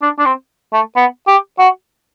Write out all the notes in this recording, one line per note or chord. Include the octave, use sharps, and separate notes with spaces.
D4
D4
C4
A3
B3
G4
F#4